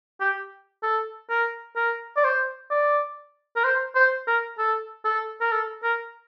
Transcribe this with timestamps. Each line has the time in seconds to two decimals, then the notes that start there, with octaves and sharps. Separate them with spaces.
0.20 G4
0.83 A4
1.30 A#4
1.76 A#4
2.17 D5
2.24 C5
2.71 D5
3.56 A#4
3.64 C5
3.95 C5
4.28 A#4
4.58 A4
5.05 A4
5.41 A#4
5.52 A4
5.83 A#4